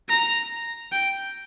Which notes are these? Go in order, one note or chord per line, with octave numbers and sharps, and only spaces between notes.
A#5
G5